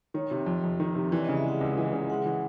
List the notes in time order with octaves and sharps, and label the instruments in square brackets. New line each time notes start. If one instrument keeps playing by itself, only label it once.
[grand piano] D#3 [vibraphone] C#5
[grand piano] C3
F2
F2
D#3
C3
[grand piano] E3 [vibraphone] D5
[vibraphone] D#5
[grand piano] C#3
[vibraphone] E5
[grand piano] G#3 [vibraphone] F#5
[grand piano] C#2
E3
C#3
[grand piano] G#3 [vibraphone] F#5
[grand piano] E3